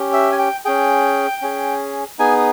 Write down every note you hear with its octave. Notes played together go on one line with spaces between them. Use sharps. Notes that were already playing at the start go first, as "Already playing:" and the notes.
Already playing: C#4 G4
E5
G#5
G5
C#4 G#4 G5
C#4 G#4
B3 D#4 G#4 G#5